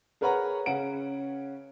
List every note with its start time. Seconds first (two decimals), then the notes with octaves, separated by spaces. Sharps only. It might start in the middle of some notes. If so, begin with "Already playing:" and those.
0.21 G#4 A#4 B4 C#5 F#5 A#5
0.66 C#3 C#4 F#5 D7